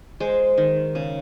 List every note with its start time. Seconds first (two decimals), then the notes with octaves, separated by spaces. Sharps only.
0.20 G#3 C5
0.58 D#3
0.95 C#3